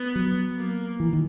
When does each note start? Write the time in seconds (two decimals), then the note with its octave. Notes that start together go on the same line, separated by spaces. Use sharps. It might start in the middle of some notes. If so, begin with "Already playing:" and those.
Already playing: B3
0.16 F#3
0.57 A#3
1.00 E3
1.13 D#3